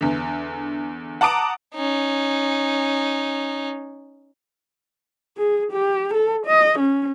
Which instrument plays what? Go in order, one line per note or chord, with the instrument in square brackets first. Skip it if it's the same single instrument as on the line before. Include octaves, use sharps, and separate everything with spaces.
[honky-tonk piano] E2 D3
F#5 A5 A#5 D6 D#6 D7
[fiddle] C#4 D#4
[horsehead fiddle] G#4
G4
A4
D#5
C#4